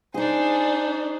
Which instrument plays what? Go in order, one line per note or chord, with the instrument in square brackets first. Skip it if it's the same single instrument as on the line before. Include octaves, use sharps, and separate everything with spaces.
[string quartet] D4 C5 [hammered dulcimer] D#4 G#4